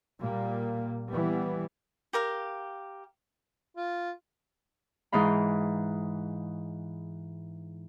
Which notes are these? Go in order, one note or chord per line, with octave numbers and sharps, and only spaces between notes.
A#2 G3 A#3
E3 G3 B3
G4 A#4 F5
F4
G#2 E3 D#4 F5 B5